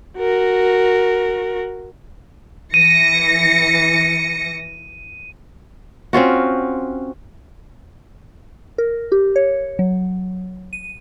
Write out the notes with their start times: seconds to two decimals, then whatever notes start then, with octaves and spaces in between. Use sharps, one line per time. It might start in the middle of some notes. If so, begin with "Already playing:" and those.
0.18 F#4 A#4
2.74 E3 A#6 C#7 D#7
6.13 C4 C#4 F4 F#4
8.78 A#4
9.12 G4
9.36 C#5
9.79 F#3
10.73 D#7